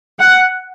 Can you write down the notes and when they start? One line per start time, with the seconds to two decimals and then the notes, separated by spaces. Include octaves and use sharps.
0.19 F#5